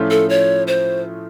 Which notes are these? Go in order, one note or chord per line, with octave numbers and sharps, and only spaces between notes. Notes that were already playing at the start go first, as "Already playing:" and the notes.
Already playing: A2 F3 A3 C#4 F4
A4
C#5
C5